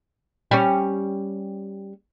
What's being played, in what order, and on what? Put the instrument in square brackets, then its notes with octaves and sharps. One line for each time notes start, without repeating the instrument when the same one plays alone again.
[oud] G3 C#4